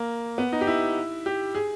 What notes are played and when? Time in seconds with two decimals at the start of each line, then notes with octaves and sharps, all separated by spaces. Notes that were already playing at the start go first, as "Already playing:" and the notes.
Already playing: A#3
0.38 B3
0.52 D#4
0.61 G4
0.67 E4
1.26 G4
1.55 G#4